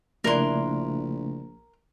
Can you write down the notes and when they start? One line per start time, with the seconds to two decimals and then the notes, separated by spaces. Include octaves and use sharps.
0.24 A#1 C#3 A3 D4 E4 A#4 C6